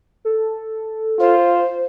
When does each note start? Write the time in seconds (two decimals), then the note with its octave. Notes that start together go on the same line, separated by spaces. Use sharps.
0.25 A4
1.20 F4 C5